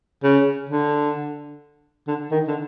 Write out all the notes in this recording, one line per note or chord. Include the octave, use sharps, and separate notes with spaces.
C#3
D3
D3
D#3
D3